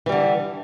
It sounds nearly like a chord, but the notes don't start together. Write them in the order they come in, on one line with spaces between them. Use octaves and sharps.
E3 G3 D3